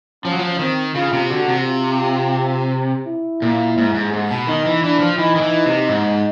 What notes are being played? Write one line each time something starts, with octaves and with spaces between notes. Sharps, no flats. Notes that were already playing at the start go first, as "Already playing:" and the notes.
F3 C#4
F#3
F3
D#3 C4
C#3 F4
C3
D3 F#4
C3
F4
E4
A#2
G#2
G#2
G#2
B2
D#3 D#4
E3
E3 D4
F3
E3 D#4
D#3
E3
C3
G#2